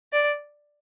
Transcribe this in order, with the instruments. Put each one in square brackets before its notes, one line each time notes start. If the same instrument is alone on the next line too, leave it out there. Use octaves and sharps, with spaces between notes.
[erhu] D5